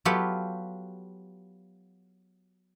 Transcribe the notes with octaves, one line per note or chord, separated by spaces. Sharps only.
F#3 B3 F4 G4 A4 F#5